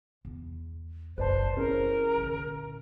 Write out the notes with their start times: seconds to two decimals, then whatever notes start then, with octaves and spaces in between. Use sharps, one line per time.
0.25 E2 E4
1.18 F#1 B1 B4 C5 D5 A5
1.57 E3 C#4 E4 G#4 A#4
2.17 A#2 D3